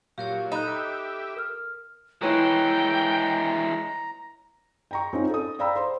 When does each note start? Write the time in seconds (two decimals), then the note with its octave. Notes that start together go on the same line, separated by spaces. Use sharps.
0.18 A#2 F#3 G4 A#4 C#5 F5
0.52 D#4 A4 B5 F#6
0.67 G4 E5
1.36 A#4 F6
2.22 E3 G#3 E4 B4 C#5 G5 A#5
4.91 G5 A#5 C#6
5.13 C4 C#4 D#4 F4
5.30 A4 D#6
5.59 D5 F5 G5 A#5 B5 E6
5.76 C5 C6